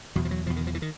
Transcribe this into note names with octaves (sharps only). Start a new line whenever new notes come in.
E2 B2 F#3
F3
F#3
E2 B2 F3
D#3
F3
E3
D#3